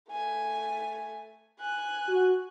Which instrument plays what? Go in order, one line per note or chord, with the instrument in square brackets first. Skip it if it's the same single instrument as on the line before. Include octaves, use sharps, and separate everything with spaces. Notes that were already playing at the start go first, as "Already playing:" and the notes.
[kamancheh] A3 G#5
G#5 F#6
[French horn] F#4